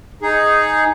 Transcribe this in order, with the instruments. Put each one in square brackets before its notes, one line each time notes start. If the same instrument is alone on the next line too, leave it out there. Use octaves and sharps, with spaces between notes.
[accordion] D#4 G#4